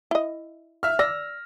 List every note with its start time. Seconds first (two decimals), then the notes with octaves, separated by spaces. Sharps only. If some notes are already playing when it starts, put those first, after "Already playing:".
0.11 E4 D#5
0.83 E5 F6
0.99 D5 E6 A#6